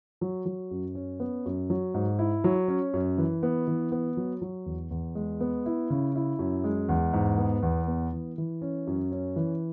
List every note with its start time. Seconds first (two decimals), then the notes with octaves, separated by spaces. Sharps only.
0.21 F#3
0.46 F#3
0.71 F#2
0.95 C#4
1.20 B3
1.46 F#2
1.70 F#3
1.94 G#2
2.19 E4
2.44 F#3
2.68 C#4
2.94 F#2
3.18 E3
3.43 B3
3.68 E3
3.92 B3
4.17 F#3
4.42 F#3
4.66 E2
4.91 E2
5.15 G#3
5.41 B3
5.66 E4
5.90 C#3
6.15 E4
6.39 F#2
6.64 G#3
6.89 E2
7.13 G#2
7.38 B3
7.63 E2
7.88 B3
8.13 E3
8.38 E3
8.62 C#4
8.87 F#2
9.12 C#4
9.36 E3